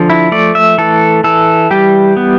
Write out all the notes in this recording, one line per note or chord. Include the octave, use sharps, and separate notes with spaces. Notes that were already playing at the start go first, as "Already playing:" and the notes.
Already playing: D3 F3
E4
A3 D5
E5
E3 A4
E3 A4
G3 G4
B3